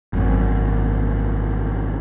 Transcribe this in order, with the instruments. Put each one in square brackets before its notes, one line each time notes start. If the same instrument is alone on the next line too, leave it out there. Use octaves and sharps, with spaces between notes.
[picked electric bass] G#1 F#2